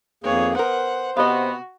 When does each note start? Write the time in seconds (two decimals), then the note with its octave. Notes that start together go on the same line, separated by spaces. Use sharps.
0.24 F2 D#3 A#3 B3 G#4 C#5
0.55 B3 A#4 C5 F#5
1.17 C3 B3 F#4 D#5 F5